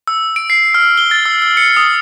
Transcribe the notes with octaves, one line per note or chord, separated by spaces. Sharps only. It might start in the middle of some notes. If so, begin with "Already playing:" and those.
E6
D7
C7
F6
G7
A6
E6
E6
C#7
D#6